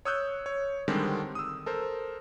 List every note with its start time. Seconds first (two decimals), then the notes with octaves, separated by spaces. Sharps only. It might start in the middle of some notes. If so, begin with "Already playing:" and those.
0.05 C#5 D#6 E6 F#6 G6
0.46 C#5
0.88 D3 D#3 G3 G#3 C4 D4
1.35 D#6 E6
1.66 A4 A#4 C5